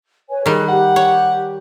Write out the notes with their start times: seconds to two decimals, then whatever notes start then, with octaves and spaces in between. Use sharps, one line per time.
0.29 B4 C#5 G#5
0.46 D#3 G3 G#4 F#6
0.69 G4 F#5
0.96 C#5